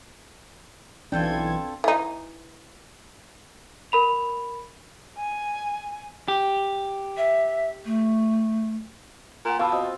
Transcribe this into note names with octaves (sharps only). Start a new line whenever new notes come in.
B1 E3 C4 D4 F4 A4 G5 G#6
E3 D#4
A#4 B5 F7
G#5
G4
E5
A3
A#2 F#5 F6
B2 F4 F5 A5 B5 D6 E6
C4 F#4 D#5 D#6